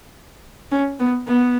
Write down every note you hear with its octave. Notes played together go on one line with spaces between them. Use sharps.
C#4
B3
B3